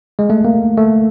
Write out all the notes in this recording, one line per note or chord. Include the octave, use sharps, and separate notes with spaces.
G#3
A3
A#3
A3